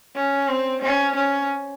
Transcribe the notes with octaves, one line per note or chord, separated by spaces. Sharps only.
C#4
C4
C#4
C#4